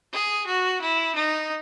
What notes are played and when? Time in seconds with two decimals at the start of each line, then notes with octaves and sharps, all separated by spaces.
0.14 G#4
0.47 F#4
0.81 E4
1.15 D#4